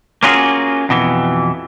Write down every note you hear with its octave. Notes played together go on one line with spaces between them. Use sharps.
A#3 C#4 F4 F#4 G#4
F2 B2 E3